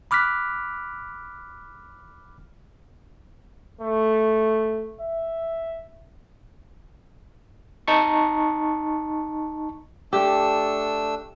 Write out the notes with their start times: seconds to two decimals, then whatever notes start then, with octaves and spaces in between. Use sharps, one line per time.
0.11 B5 D6 F6 F#6 B6
3.81 A3
5.01 E5
7.88 D#4 A5 C#6
10.13 A3 D4 G4 E6